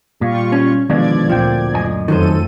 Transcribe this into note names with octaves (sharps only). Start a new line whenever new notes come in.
A#2 G3 F4 C#6
C#4
B2 D3 D#3 F3 G#3 D4 D5 G#6
D2 A#2 F3 C4 G5
F#2 D#5 G#5
F2 D#3 F#3 A3 A4 C5 D#7